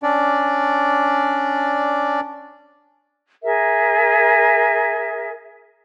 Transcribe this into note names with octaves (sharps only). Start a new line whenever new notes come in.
C#4 D4 D5
G#4 A#4 E5